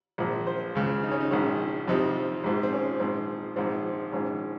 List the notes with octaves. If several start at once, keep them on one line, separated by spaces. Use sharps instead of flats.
A#1 A#2 F3
C5
C#2 C#3 F3
D#4
C#4
D#4
A#1 G#2 D#3 C#4
F2 C3 F3 D#4
A#1 G#2 F3
C4
C#4
A#1 G#2 F3 C4
A#1 G#2 F3 C4
A#1 G#2 F3 C#4